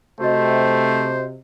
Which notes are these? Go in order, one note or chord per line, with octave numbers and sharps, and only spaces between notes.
C3 A3 F#4 C5 D#5